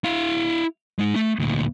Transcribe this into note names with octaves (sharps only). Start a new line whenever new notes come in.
E4 F5
G#3 D#4
A3
D2 A#2